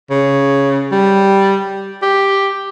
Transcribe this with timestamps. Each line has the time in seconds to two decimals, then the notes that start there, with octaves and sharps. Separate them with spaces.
0.10 C#3
0.92 G3
2.02 G4